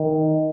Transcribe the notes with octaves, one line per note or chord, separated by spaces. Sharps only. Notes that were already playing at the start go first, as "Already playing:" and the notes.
Already playing: D#3